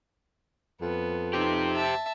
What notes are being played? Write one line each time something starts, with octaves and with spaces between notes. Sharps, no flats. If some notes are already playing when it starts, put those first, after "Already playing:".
F2 B3
D#4 G4 C5
E5 A5